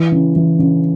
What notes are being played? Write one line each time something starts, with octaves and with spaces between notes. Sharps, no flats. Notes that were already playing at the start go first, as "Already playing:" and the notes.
Already playing: E3
C#3
E3
C#3